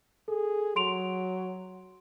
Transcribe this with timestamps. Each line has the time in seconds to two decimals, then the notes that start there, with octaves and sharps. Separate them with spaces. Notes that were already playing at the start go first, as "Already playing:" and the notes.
0.28 G#4 A4
0.76 F#3 C6 D7 F7